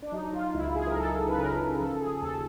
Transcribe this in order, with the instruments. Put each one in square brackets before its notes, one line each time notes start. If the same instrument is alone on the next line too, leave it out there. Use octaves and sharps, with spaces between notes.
[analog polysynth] D4
F#3 D#4
F4
C#2 E4
G#4
A#4
C#2 A4
B4
C#3 A#4
F3 A4
G#4
D#2 A4